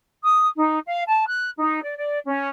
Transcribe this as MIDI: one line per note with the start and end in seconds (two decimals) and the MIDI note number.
0.23 0.46 87
0.56 0.78 63
0.86 1.01 77
1.07 1.25 81
1.25 1.49 90
1.58 1.81 63
1.82 1.95 74
1.97 2.19 74
2.26 2.47 61